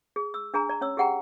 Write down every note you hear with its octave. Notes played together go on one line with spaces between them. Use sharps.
G#4
E6
D4 G#4 G#5 A#5
D5 A#5
C#4 C#5 E6
G4 G#4 F#5 G5 A#5